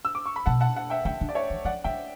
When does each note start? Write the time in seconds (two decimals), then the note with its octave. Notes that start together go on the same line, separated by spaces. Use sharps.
0.05 E6
0.15 D6
0.26 C#6
0.36 B5
0.46 B2 F#5 A5
0.61 F#5 A5
0.76 F#5 A5
0.90 E5 G5
1.05 C#3 E5 G5
1.21 D3
1.29 D5
1.35 C#5 E5
1.50 E3
1.65 F#3 D5 F#5
1.84 G3 E5 G5